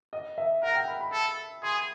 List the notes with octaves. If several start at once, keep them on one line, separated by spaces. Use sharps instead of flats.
D#5
E5
A#4 F#5
G5
B5
B5
A4
G#4 C6